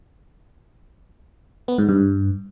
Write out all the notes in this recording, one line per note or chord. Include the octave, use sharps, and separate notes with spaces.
B3
G#2
G2